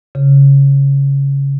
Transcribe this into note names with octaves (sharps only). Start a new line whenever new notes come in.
C#3